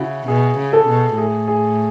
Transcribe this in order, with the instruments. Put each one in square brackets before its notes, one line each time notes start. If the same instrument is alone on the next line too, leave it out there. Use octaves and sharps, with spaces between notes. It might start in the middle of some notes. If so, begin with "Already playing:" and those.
Already playing: [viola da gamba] C#3 [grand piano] E4 F#4
[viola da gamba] B2 [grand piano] G#4
[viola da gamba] C#3
[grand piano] A4
[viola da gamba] B2
[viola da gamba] A2 [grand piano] G#4
[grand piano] G#4